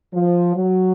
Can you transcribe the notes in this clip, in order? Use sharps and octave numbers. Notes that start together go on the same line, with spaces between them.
F3
F#3